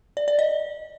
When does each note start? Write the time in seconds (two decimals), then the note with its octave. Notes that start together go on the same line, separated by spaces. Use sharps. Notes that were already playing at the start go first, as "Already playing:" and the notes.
0.17 D5
0.28 D5
0.39 D#5